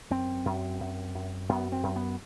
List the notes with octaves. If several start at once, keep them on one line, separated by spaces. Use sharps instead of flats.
F#2 C4
F#2
F#2
F#2
F#2 B3
C4
F#2
B3